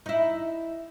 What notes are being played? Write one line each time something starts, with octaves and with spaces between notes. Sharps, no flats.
D#4 E4